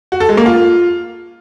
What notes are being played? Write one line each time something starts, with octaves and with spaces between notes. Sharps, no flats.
F#4
A4
G#3
A#3
F4